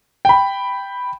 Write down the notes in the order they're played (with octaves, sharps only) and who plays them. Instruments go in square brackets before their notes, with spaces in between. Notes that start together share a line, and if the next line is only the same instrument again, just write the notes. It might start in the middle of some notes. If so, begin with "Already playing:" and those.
[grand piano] G5 B5